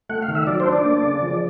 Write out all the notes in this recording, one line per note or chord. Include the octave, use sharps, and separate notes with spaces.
A3 F#5
F5
D#3
E5
F#3 D5
C5
D4
D5
A#3
C#3
F3